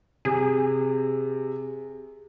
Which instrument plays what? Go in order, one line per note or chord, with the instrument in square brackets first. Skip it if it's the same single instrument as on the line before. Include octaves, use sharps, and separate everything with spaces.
[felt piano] C3 [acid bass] G#4